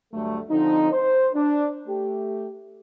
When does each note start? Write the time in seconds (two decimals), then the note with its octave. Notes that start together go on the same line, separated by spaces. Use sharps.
0.13 D2 G2 F#3 A3
0.50 D3 F3 C4 D#4
0.92 C5
1.34 D4
1.87 A3 G4